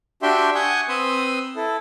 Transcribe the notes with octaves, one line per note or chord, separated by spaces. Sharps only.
D4 F#4 G4 E5 G5 C6
F#5 G#5 C#6 D#6 G6
C4 B4 B5 C6 D#6 E6
E4 A4